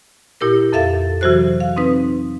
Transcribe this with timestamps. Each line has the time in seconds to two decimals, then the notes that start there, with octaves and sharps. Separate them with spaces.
0.41 A#2 E4 G4 A#4 A#6
0.73 F2 A4 E5 F5 A6
1.21 C3 E3 F#3 F#4 C5 F#6
1.60 F5
1.76 C4 D#4 B4